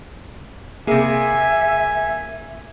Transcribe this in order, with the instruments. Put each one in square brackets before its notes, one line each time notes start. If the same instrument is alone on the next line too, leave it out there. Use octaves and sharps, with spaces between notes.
[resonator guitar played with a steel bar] C3 G#4 [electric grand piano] A#3 [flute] E5 [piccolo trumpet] G#5